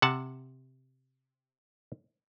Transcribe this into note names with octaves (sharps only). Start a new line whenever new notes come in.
C3 F#5 A5